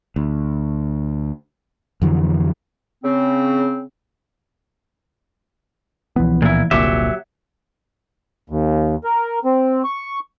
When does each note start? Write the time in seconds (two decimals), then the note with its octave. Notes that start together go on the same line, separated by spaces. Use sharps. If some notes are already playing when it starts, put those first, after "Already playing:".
0.16 D2
2.02 F2 D3 E3 F#3
3.04 C#3 C4
6.16 C#2 B2 E3 F3 B3
6.42 A#2 E4
6.71 F1 C2 A#2 D3 F#3 A#3 G4 E5
8.50 D#2
9.04 A#4
9.45 C4
9.84 C#6